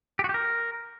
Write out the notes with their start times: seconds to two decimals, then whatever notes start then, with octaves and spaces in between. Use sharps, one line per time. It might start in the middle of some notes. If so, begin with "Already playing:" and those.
0.19 G4
0.24 F#4
0.29 G4
0.34 A#4